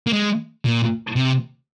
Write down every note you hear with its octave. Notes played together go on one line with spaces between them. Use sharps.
A#3
G#3
A#2
C3